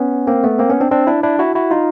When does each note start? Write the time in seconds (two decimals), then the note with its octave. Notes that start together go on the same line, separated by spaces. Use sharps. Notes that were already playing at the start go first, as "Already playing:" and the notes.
Already playing: B3 C#4
0.27 A#3 C4
0.44 A3 B3
0.59 A#3 C4
0.70 B3 C#4
0.81 C4 D4
0.91 C4 D4
1.07 D4 E4
1.23 D4 E4
1.39 E4 F#4
1.55 E4 F#4
1.71 D#4 F4